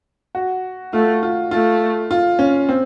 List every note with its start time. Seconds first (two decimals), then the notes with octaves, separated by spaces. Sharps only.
0.35 F#4
0.93 A3 F4
1.23 F4
1.51 A3 F4
2.11 F4
2.39 C#4
2.69 C4